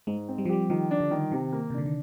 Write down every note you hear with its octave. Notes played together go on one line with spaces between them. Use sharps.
G#2 G#3
C4
G3
F3
G3 G4
D#3 F3
D4
D3
D#3
C3 D#3
A#3
C3
D3 D4
D#3